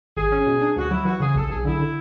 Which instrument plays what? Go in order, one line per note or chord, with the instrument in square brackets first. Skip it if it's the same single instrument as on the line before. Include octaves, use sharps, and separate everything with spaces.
[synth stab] G#1 [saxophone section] G#4
[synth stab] C#4
B2
D4
[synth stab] D2 [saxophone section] F#4
[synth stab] F#3 [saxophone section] E4
[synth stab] E3 [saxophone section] F#4
[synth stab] C#3 [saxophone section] G#4
[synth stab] B1 [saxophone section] A4
[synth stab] B1 [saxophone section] G#4
[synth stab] D3 [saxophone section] E4
[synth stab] D3